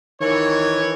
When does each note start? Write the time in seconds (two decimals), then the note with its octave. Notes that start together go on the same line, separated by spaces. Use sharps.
0.21 D#3 E3 C#5